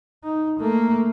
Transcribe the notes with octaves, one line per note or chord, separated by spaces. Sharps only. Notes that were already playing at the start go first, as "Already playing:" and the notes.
D#4
A3 A#3